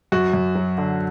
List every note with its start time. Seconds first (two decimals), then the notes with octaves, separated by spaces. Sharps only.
0.12 F#2 F#4
0.33 F#2
0.55 F#3
0.78 D3